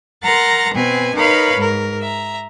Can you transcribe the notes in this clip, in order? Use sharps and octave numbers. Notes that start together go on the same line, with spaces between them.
A#4 F#5 A#5 C6 A6 A#6
B2 C4 B4 G#5
D#4 A#4 B4 C#5 F5 B5
G#2 A#4
E5 A#5